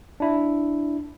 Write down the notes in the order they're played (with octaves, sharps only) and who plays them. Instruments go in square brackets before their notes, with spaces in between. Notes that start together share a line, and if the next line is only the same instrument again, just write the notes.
[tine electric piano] D4 E4